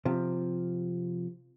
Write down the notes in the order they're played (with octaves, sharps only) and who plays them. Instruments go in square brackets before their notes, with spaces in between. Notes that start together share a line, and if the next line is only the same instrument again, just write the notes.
[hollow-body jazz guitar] C3 F3